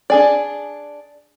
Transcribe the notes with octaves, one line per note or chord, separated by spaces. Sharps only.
D4 G#4 D5